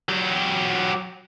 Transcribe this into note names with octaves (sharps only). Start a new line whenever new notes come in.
F#3 G4